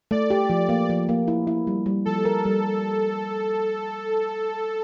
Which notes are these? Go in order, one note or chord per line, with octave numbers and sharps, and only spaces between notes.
A3 D5
G4
F3
A#3
F3
A#3
E4
E4
G3
G3
F3 A4
A#4
G3